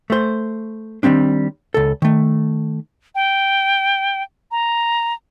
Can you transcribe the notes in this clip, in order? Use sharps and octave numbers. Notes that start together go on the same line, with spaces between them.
A3 C5
D#3 F3 G3 C4 D4
C#2 A4
D#3 A3
G5
A#5